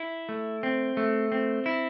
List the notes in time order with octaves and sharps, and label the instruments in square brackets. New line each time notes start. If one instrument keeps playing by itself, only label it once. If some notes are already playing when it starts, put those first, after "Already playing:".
Already playing: [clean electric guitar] E4
A3
C4
A3
C4
E4